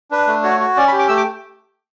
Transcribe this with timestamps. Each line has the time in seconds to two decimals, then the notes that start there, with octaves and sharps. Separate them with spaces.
0.11 D4 B4
0.27 A3
0.43 F#4 C#5
0.60 F#4
0.77 C#4 D5
0.88 B5
0.92 G4
0.99 D6
1.09 A3 E6
1.17 D6